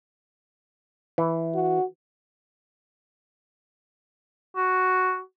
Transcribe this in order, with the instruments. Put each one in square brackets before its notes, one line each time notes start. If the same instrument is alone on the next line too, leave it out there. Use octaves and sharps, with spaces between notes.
[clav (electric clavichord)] E3
[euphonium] F#4
[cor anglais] F#4